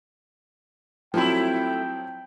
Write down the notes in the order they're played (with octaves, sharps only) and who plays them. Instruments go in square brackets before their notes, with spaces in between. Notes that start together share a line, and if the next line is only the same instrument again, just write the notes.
[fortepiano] F3 F#3 C4 [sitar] A3 E4 [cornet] G5